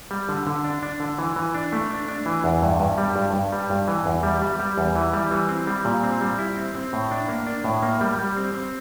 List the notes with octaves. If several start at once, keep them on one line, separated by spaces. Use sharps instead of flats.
G3
D3
D3
D4
D4
D3
E3
E3
D4
A3
D4
D4
E3
E2
G2
G2
G3
G2
G2
G3
G2
E3
E2
G3
G3
G3
E2
E3
G3
E3
C4
G3
A#2
C4
G3
E4
C4
C4
A2
D4
A#3
D4
A2
A#3
G3
G3
C4
C4